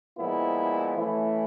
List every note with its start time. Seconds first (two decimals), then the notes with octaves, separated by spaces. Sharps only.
0.18 A#2 F3 G#3 B3 E4
0.96 E3 A3 C#4 E4